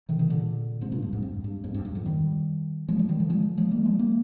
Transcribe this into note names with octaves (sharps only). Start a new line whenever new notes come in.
C3 D#3
C3 D#3
A#2 D3
G#2 C3
G2 A#2
G2
F2 G#2
G2
G2
F2 G#2
G2
G2
F2 G#2
D#3 G3
F3 G#3
F3 G#3
D#3 G3
D3 F3
F3 G#3
F3 G#3
G3 A#3
F3 G#3
G3 A#3